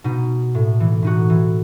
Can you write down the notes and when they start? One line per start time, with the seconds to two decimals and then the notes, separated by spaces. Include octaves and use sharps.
0.04 B2 D#4
0.55 A2
0.80 E3
1.02 A2 D#4 F#4
1.30 E3